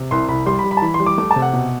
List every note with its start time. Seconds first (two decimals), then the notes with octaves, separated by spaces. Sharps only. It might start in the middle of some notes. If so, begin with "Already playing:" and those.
Already playing: C3
0.11 C2 C6
0.28 C2 B5
0.46 G3 C6
0.59 B5
0.64 G3
0.71 B5
0.77 A5
0.82 E3 B5
0.94 C6
1.00 G3
1.06 D6
1.18 A3 D6
1.31 A5
1.36 C3
1.42 F#5
1.53 B2